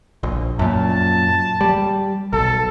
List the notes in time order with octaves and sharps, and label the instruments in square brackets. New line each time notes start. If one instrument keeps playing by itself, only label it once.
[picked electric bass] A#1
[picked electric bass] F#2 A#2 [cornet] A5
[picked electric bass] G3
[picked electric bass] B1 [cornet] A4